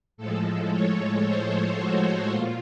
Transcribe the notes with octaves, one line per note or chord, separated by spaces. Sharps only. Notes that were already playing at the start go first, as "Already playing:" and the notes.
A2 F3 G#3 A4
C#5
C5
F#4
A#2 F4